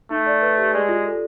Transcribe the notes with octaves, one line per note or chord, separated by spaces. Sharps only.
A3 D#4
D5
B4
G4
G#3 D5
F4
A4